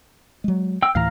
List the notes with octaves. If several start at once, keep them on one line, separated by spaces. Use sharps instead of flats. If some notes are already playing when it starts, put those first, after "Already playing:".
F#3 G#3
G5 E6
D2 A2 E3 F5 A#5